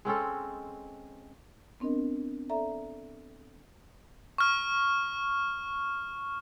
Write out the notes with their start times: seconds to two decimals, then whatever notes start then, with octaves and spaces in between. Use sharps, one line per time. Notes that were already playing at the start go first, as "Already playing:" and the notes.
0.05 G#3 C4 C#4 A4
1.80 B3 C4 D4 A#4 D#5
2.50 A4 D5 E5 A#5
4.38 C#6 F6